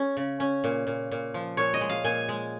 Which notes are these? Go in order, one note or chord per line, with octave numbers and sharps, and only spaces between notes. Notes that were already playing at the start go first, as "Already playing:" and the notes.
Already playing: C#4 G#4
C#3
C#4
A#2
A#2
A#2
F3
A#2 C#5
D#5
G#3
F5
A#2 G#5
G#3